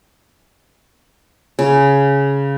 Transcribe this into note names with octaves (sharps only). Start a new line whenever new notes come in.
C#3